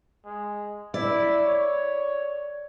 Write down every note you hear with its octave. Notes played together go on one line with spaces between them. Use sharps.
G#3
E4 D5
C#5